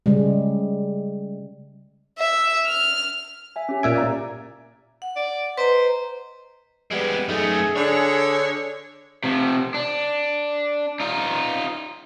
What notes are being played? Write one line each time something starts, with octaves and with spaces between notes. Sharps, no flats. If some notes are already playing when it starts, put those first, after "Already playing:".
C#3 G3 G#3
E5
F6
E5 G#5
C#4 G4
A#2 E5 G#5 D7
D5 F5 A#5
F#5
D5
B4 C5 D#5 A#5
G3 G#3 B3
F#2 A3 D#4 G#4
D3 D4 C#5
C3 F3
D4
D#4 F4